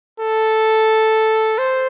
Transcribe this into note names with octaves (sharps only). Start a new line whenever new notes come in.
A4
C5